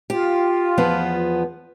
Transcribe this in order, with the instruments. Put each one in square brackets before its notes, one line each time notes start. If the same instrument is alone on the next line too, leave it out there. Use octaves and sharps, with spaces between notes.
[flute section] F4 [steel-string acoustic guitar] G4
[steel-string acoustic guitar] E2 F3 B3